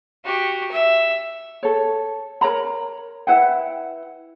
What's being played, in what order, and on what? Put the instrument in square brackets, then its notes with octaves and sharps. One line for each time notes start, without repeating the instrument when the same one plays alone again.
[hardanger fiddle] F#4 G4
E5
[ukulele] A4 C#5
A#4 C#5 A#5 B5
E4 B4 F#5 G5